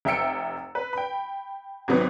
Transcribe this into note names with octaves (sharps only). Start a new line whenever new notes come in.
F1 E5 G5 E6 C#7 D7
B4
G5 B5
G#1 C3 F#3 B3 D#4